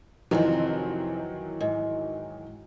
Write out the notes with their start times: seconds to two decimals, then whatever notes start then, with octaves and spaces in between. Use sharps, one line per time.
0.31 F2 C3 D#3 E3 F#3 C4
1.60 G#2